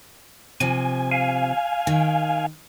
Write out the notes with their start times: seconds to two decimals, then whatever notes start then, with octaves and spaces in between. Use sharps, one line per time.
0.60 C3 F3 G#5
1.11 F5 G#5
1.87 D#3